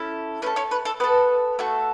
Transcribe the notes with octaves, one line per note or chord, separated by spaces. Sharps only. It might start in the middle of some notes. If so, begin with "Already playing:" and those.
Already playing: C#4 E4 A4
A3 C#4 A4 B4
C#4 C#5
B4
A4
B3 A4 B4
A3 F#4 A4